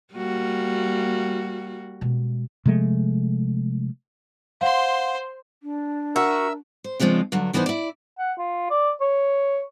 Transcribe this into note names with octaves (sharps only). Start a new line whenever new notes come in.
G3 A#3 F#4
B2 G#3
C3 F3 G#3 A3
C5 F5 F#5 C6
D4
F#4 A#4 E5 E6
C5
C#3 F3 G#3 C4 D4
G2 D3 F#3
F2 E3 B3 D4 D#4 C5
E4 D5
F#5
F4
D5
C#5